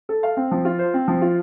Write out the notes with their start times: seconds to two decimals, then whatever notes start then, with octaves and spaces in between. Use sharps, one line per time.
0.09 A4
0.23 F5
0.37 C4
0.51 F3
0.65 F4
0.79 C5
0.94 C4
1.08 F3
1.21 F4